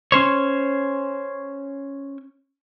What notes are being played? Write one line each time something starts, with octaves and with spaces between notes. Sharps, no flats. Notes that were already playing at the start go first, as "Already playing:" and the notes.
C#4 C5 C#5